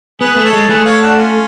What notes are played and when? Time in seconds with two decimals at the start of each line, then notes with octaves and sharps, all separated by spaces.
0.20 B3 G#4 B4
0.36 A3
0.45 A4 C#5
0.53 G#3
0.69 A3 G#4 B4
0.85 C#5 F5
1.02 D4 F#4
1.17 C#4 F4